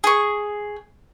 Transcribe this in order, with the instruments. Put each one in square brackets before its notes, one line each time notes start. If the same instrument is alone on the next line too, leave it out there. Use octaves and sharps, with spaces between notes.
[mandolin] G#4 C#6